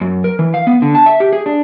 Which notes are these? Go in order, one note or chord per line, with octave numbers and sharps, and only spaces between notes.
F#2
A#4
E3
F5
B3
D3
A5
E5
G4
G#4
D4